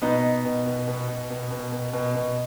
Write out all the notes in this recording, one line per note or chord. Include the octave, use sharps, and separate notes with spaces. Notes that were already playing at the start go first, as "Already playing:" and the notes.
B2 B3 D#4
B2
B2
B2
B2
B2
B2
B2
B2
B2
B2